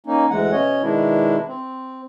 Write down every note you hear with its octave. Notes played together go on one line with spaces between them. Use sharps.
A#3 C#4 D#4
D2 E3 G#3 F#5
B2 C#4 C#5 D#5
B2 D#3 G#3 D4 E4
C4